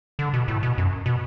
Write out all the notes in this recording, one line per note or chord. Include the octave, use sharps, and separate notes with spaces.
D3
B2
A2
B2
F#2
B2